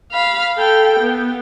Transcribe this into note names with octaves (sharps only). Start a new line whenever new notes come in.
F5 B5
A4 G5
B3